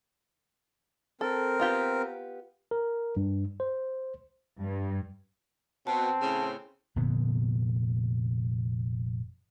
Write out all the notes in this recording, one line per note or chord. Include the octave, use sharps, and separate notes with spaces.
C4 A4 A#4
B3 F4 G4
A#4
G2
C5
G2
B2 C4 A5
A2 C#3
F1 A#2 D3 B3